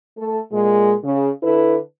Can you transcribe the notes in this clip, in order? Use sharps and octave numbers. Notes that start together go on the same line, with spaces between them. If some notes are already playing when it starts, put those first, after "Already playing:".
A3 A4
A#2 G#3
C#3
D3 E4 A4 B4